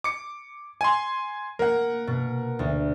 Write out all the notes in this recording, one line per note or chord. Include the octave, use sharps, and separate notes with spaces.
D6 C#7
G#5 C6
A#3 A#4 F#5
B2
D2